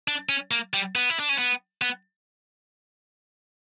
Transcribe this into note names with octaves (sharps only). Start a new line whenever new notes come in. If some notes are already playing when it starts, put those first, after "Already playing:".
D4
C#4
A#3
G3
B3
E4
D4
C#4
B3
B3